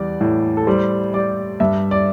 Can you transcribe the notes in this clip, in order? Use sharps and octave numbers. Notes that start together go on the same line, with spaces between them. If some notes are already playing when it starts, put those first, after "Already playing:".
Already playing: E2 G3 D5
A2
A4
G3 C5
G3 D5
G2 E5
D5